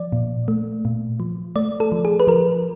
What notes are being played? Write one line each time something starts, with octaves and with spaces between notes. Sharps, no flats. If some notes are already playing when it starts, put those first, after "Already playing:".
Already playing: F3 D5
A#2
A3
A#2
F3
A3 D5
A4
F3
G#4
B4
F3 A#4